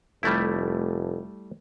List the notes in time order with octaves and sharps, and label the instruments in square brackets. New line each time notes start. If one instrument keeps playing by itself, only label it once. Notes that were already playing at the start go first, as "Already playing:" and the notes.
[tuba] F1 [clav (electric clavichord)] G3 A3 E4